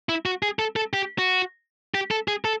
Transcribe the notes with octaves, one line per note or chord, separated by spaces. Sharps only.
E4
F#4
G#4
A4
A4
G4
F#4
G4
A4
G#4
A4